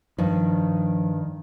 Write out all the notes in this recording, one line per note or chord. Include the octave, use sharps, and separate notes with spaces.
G2 D#3 F3